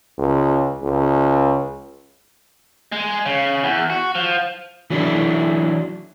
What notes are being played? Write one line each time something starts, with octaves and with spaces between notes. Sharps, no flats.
C#2
C#2
G#3
C#3
E2
F#4
F3
E3 F#3 D4 E4